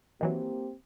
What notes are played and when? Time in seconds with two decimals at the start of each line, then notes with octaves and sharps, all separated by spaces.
0.21 D#3 E3 F#3 A#3 C4 G4